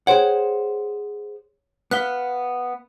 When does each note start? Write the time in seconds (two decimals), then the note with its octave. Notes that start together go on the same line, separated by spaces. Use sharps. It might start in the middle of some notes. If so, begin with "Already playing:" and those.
0.07 G#4 C5 C#5 F#5 G5
1.91 B3 F5 F#6 B6 G7